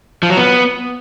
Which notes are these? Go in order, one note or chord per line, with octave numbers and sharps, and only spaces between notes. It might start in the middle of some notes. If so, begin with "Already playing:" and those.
F3
F#3
B3